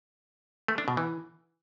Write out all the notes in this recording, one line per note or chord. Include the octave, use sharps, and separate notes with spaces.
A3
D4
B2
E3